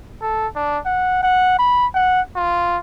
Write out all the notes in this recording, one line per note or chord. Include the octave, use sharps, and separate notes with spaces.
A4
D4
F#5
F#5
B5
F#5
F4